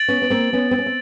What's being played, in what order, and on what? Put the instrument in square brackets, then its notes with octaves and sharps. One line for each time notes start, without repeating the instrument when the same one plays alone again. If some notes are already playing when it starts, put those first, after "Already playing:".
Already playing: [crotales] A6 D7 F#7
[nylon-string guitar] B3 C#4
B3
A#3 C4
B3 C#4
C4
C#4
C4